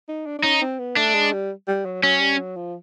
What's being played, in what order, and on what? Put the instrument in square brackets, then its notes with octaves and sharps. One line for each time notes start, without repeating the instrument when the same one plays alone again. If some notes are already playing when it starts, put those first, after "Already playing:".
[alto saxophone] D#4
D4
D4
[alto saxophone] C#4 [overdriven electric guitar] D#4
[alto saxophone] C4
B3
[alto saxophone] A3 [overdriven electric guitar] D4
[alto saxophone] G#3
G3
G3
F#3
[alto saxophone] F#3 [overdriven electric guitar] C#4
[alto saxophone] G3
F#3
F3